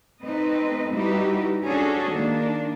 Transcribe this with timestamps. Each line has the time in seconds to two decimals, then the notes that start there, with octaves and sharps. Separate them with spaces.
0.22 A3 C4 D#4 B4 D#5
0.92 G3 D#4 E4 F#4 G4 B4
1.64 C#4 D4 F#4 G#4 A4
2.10 D#3 A#3 D4